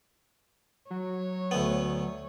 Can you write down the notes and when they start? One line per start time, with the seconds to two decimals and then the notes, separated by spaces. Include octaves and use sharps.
0.91 F#3 C#5
1.51 D2 B3